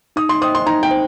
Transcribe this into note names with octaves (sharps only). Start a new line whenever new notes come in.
D#4 D#6
C6
C5 D#5 G5 D#6
C6
D#4 A#5
G5
C5